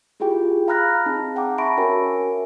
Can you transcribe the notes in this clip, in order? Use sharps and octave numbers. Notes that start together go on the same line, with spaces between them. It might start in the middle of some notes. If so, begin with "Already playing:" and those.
E4 F4 G4 G#4 G5
F5 A#5 B5 F6 F#6 A#6
C4 D#4 G#4 A5
F#5 G5 A#5 D6
E5 A5 B5 C#6 A#6 D7
C#4 F#4 A#4 C#5 E5 G#5